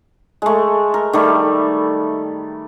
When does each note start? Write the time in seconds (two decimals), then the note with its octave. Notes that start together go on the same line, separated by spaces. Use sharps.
0.42 G#3 A3
0.94 A#4
1.13 D#3 G3 A3